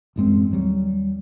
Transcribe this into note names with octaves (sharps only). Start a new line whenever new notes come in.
A1 F#2 G#3 C4
D#2 F#3 G3